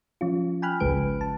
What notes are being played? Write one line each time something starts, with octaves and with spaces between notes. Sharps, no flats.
F3 C#4 F4
G5 G#5 B5 F6 F#6
G#1 C#2 C#3 G#3 B4 D7
A5